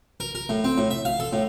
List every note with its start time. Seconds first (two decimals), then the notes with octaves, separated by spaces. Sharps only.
0.20 A#4
0.35 A#4
0.49 A2
0.64 C4
0.78 A2
0.91 E5
1.05 F5
1.20 A4
1.33 A2